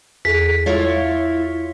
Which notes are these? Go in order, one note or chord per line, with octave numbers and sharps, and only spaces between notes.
E2 G#4 A4 B6
E4 F4 C#5